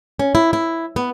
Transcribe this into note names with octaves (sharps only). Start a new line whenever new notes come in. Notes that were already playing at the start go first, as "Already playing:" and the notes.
C#4
E4
E4
B3